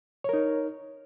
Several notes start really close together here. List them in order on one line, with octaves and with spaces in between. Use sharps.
C#5 A#4 D#4